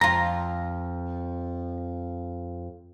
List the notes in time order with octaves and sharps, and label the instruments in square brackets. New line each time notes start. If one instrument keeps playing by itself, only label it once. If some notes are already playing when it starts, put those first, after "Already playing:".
[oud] F2 F4 [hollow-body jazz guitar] A#5